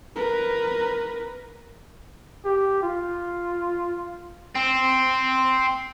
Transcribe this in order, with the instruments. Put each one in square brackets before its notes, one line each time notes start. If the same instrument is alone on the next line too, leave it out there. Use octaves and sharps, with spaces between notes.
[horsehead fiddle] A#4 B4
[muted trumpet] G4
F4
[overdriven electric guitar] C4